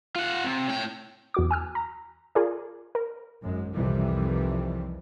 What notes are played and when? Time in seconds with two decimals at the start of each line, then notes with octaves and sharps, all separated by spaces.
0.16 F4 F#5
0.45 C3
0.69 A2 G5
1.34 E2 F#4 D6
1.51 G#5 E6 F6
1.75 A#5
2.35 F4 G#4 A#4 D5
2.95 A#4
3.42 G#1 F#2 G#3
3.73 C2 F2 C3 D#3 E3 G3